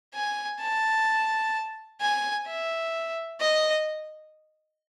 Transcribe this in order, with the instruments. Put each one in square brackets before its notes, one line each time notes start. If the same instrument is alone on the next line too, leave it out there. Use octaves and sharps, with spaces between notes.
[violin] G#5
A5
G#5
E5
D#5